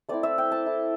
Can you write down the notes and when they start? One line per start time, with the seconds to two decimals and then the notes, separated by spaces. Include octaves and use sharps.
0.09 A3 C4 E4 D5
0.23 E5
0.38 G5
0.52 A5
0.66 A3 E4